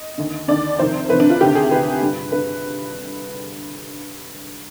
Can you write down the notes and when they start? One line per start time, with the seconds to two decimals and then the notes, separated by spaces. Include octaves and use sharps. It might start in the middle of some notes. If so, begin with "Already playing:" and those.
Already playing: D#5
0.18 D#2 D3
0.48 D#2 D3 D5
0.79 F2 C3 D#3 C5
1.09 F2 C3 D#3 B4
1.20 D4
1.30 F4
1.40 D2 C3 D#3 G4
1.55 G#4
1.71 D2 C3 D#3 B4
2.02 G2 D3
2.32 D3 B4